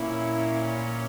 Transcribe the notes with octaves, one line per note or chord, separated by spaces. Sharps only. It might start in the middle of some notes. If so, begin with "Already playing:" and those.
Already playing: A#2 A#3 C#4 E4